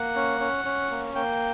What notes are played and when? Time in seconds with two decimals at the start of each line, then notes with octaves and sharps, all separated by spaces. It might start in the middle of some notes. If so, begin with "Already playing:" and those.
Already playing: A#3 F#5
0.16 C#4
0.40 C#4
0.65 C#4
0.91 A#3
1.15 A#3 G5